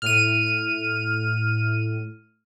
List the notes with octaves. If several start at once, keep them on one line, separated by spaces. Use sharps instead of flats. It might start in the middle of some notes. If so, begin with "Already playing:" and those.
A2 F6 D#7